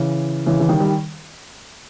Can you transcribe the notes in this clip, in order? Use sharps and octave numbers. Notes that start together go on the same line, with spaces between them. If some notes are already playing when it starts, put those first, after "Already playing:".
Already playing: C#3 E3
C#3 E3
E3
D#3 G3
G3